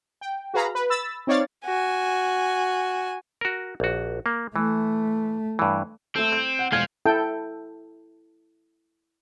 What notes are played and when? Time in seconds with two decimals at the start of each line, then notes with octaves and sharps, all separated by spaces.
0.21 G5
0.54 F#4 G#4 B4 F5 A#5 B5
0.75 B4
0.90 B5 E6 A6
1.27 C4 D#4 C#5 D5 F5 A6
1.65 F#4 G#5
3.41 F#4 A#4
3.80 A#1 F#4
4.26 A#3
4.56 E3 A3
5.59 G2 E3
6.16 A3 C4 A4
6.32 G6
6.59 F#5
6.72 E1 F3 F5 G#6
7.06 E4 A4 G5